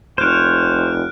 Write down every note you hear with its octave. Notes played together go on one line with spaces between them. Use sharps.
F1 C5 C#5 F6 F#6 D7